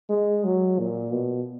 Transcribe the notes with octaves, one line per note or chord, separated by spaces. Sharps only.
G#3
F#3
A#2
B2